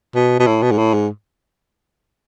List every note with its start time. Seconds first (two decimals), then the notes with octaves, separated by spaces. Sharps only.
0.15 B2
0.40 B2
0.47 A2
0.62 B2
0.72 G#2
0.78 A2
0.94 G#2